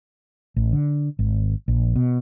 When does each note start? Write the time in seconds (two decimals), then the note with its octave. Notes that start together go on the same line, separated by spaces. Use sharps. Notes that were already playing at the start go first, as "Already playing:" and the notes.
0.56 A1
0.73 D3
1.19 G#1
1.68 A#1
1.96 B2